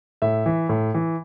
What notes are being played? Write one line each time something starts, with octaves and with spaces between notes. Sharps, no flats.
A2 E5
E3
A2
E3